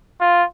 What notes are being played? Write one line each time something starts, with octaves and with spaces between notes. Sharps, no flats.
F4